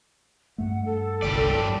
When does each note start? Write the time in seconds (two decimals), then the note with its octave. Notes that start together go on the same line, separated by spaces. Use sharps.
0.58 G2 A3 F#5
0.85 A4
1.22 G1 C2 F#2 G3 D5
1.53 G2 A5